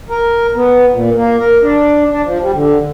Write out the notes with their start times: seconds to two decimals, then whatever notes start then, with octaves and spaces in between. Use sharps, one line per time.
0.09 A#4
0.55 B3
0.92 A#2
1.16 A#3
1.38 A#4
1.62 D4
2.10 D4
2.24 F3
2.41 G3
2.54 D3